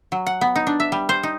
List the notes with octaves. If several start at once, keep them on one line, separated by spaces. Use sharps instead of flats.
F#3
F#5
B3
D#4
D4
E5
G3
C5
D#4